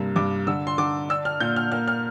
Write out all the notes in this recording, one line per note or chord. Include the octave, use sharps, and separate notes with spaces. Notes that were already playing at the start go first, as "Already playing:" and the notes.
Already playing: G2 C3 A#3
G2 D6
D3 E6
C6
D3 D6
D4 E6
F6
A#2 G6
F6
A#3 F6
F6